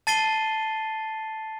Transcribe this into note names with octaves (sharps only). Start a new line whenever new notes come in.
A5 A6 C7 D#7 G7